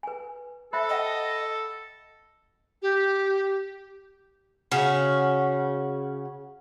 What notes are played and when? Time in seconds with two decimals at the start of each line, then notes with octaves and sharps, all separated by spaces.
0.03 B4 G#5
0.73 A4 C5 E5 B5
0.89 D#5 F#5 G5 A5
2.82 G4
4.72 C#3 C#4 F#4